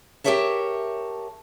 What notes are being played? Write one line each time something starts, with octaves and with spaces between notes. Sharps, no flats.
G4 G#4 A#4 C#5 E5 A5